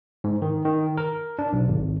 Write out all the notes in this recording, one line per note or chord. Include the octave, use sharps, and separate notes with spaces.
G#2
D#3
D#3
A#4
D4
B1
G#1